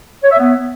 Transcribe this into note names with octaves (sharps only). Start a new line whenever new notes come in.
C#5
E5
B3